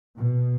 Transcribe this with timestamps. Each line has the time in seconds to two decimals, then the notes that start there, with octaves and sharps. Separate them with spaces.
0.17 B2